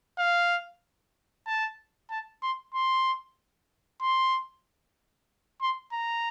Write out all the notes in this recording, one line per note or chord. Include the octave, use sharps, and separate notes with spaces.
F5
A5
A5
C6
C6
C6
C6
A#5